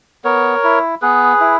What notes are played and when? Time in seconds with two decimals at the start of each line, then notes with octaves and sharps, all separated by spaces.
0.24 B3 A#4 C#5
0.64 E4
1.02 B3 G#4 B4
1.40 E4